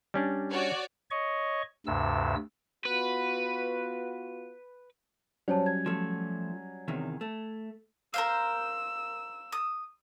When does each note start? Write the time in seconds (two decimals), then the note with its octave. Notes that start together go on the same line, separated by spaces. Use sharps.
0.14 G3 C#4 D4
0.52 F#4 C#5 D5
1.11 C#5 D#5 C#6
1.86 D2 G2 C3 E6
2.86 B3 F4 F#4 B4
5.48 F#3 G3 C#4 C5 C#5 A5
5.66 G#6
5.86 F3 A3
6.88 E2 C3 D#3
7.21 A3
8.14 A#4 C5 F5 E6
9.52 D#6